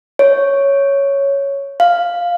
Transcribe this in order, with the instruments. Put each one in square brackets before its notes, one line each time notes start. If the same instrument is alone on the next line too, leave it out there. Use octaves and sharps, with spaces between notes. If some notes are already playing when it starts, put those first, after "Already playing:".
[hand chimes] C#5
F5